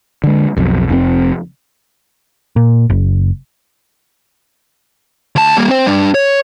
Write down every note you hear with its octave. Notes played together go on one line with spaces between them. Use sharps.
D3 G#3
B1 F2
F1 F2 C3 C4
A#2
F#1
D2 A5
G3 A#3
C4 C5
G3 D4
C#5